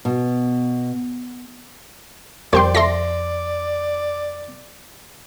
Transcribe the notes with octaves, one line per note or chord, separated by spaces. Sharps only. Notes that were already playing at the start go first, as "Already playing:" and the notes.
B2
F2 G3 A#3 F4 C5 D5 G5 C6
F4 A4 E5 C6 A#6